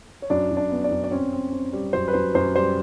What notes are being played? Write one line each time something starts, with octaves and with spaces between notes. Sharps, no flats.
C#5
F#2 D4 D5
F#2
D4 D5
B3
D4 D5
F#2
D5
C4 C#4 C#5
C4
C4
G3
F#2 C5
B4
F#2 C5
F#2 C5
G3 C5